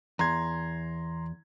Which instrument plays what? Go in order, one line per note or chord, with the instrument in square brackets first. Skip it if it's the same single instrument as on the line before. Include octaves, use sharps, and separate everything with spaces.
[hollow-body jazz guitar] E2 [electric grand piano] A#5 C6 G#6